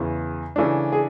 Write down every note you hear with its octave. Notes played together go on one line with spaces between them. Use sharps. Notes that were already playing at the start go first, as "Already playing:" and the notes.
Already playing: E2 C#3 E3
C#3 E3 A3 D4
G#4